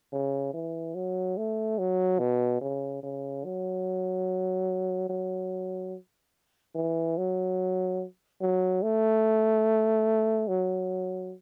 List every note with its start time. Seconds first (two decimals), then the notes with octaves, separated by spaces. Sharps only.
0.13 C#3
0.54 E3
0.95 F#3
1.38 A3
1.79 F#3
2.19 B2
2.61 C#3
3.03 C#3
3.45 F#3
5.10 F#3
6.75 E3
7.17 F#3
8.41 F#3
8.83 A3
10.48 F#3